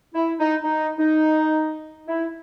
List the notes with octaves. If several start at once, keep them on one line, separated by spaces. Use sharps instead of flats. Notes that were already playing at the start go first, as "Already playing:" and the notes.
E4
D#4
D#4
D#4
E4